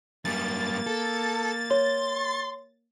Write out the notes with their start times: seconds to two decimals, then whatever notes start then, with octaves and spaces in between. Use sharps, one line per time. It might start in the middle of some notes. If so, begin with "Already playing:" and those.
0.25 F#2 G3 A#3 A6
0.87 A4
1.71 C#5 C6